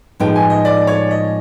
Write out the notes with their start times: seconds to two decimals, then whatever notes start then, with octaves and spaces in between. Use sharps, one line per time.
0.20 A2 F3 G#3 B3 D#4 G5
0.36 G#5
0.50 D#5
0.65 D5
0.87 C#5
1.11 D#5